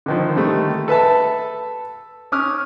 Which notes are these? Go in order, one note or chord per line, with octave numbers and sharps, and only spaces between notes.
D3 D#3 F3
D3 D#3 G3 A3
A4 B4 E5 A5
C#4 D6 D#6 F6